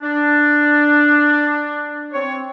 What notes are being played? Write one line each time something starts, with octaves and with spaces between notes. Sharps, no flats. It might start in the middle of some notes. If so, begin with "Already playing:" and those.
D4
C4 C#5